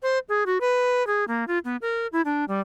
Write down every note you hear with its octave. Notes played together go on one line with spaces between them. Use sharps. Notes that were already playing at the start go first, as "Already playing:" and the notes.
C5
G#4
F#4
B4
G#4
A#3
F4
B3
A#4
E4
D4
G3